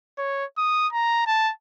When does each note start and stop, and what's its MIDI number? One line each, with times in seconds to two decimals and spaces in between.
0.18 0.45 73
0.58 0.87 87
0.93 1.26 82
1.27 1.52 81